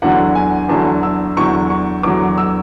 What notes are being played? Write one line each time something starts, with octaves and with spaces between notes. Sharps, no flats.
E2 D3 F#3 F#5
G#5
E2 D3 F#3 A5
E6
E2 D3 F#3 C#6
C#6
E2 D3 F#3 D6
E6